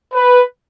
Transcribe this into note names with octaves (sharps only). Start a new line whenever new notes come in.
B4